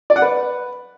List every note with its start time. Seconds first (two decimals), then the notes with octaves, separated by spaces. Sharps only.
0.10 D5
0.16 F#5
0.22 B4